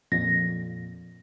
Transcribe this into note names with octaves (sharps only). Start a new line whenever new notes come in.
F2 A#2 A#6